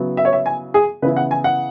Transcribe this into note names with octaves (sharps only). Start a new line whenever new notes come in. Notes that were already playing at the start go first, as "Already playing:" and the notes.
Already playing: C#3 F#3 B3 E4
E5
C#5
E5
G#5
G#4
C#3 E3 B3 E4 B4
F#5
G#5
F#5